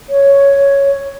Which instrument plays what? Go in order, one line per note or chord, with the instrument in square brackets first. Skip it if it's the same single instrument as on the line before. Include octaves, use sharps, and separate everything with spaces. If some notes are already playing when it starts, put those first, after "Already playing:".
[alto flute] C#5